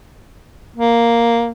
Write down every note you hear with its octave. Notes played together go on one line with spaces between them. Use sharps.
A#3